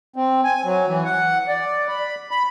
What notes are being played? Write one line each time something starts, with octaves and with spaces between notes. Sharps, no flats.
C4
G#5
F#3
E3
F#5
D5
B5
B5